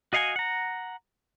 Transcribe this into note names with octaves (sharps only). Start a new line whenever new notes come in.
F#4 D#5 F5 F#5 G#5
F#5 A#5